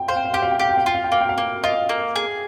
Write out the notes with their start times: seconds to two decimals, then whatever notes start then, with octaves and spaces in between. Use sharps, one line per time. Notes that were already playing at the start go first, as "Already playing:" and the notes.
Already playing: G5
0.08 C5 F5
0.16 G5
0.25 F5
0.33 G4 G5
0.42 F5
0.51 G5
0.59 G4 F5
0.69 G5
0.77 F5
0.86 F4 G5
0.95 F5
1.04 G5
1.12 A#3 F5
1.21 G5
1.29 F5
1.38 A#3
1.64 F4 D#5
1.89 A#3
2.16 G#4